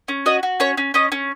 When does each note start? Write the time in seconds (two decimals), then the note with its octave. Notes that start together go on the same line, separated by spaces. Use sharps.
0.08 C#4
0.26 F#4 D#5
0.43 F#4
0.60 C#4 C#5
0.77 C#4
0.94 C#4 D#5
1.12 C#4